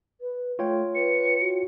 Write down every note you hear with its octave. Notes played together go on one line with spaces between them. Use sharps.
B4
A3 F4 C#5 G5
B4 C#7
F#4